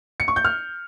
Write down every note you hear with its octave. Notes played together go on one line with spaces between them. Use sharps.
C#7
C#6
G6
F6